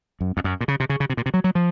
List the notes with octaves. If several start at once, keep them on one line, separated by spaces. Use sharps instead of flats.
F#2
F2
F#2
A#2
C#3
C3
C#3
C#3
C3
A#2
C3
F#3
F#3
F3